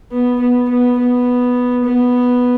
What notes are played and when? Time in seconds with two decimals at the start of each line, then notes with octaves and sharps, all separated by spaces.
0.11 B3
0.40 B3
0.69 B3
0.97 B3
1.84 B3